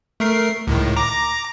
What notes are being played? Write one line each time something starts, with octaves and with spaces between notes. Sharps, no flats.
A3 A#4 C7
C#2 A2 D#3
A#5 D6 A#6